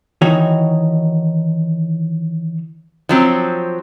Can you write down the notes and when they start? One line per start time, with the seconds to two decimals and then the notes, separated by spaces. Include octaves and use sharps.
0.22 D#3 E3 D#4 F#4 C#5
3.09 F3 F#3 C4